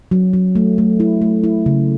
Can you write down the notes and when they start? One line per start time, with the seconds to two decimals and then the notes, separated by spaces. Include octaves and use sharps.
0.11 F#3
0.33 F#3
0.55 A3
0.78 A3
1.00 E4
1.22 A3
1.44 E4
1.66 C#3